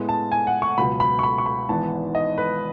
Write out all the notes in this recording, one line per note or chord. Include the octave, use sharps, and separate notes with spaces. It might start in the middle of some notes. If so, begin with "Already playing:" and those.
Already playing: A2 G#3 B3
A5
G#5
F#5
C#6
C#2 B2 F#3 B5
B5
C#6
B5
C#6
B5
G#1 G#2 E3 B3 A5
D#5
B4